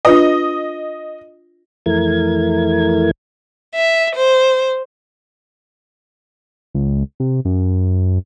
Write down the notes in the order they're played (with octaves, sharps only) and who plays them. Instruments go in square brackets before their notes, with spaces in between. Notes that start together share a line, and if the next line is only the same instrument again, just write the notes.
[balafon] D4 F4 B4 [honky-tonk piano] D#5
[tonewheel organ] F2 E3 A3 E4 A#4 G#6
[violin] E5
C5
[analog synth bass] C#2
C3
F#2